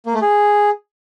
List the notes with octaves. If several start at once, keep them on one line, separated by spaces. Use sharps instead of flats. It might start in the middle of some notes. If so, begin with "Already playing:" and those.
A#3
A3
G#4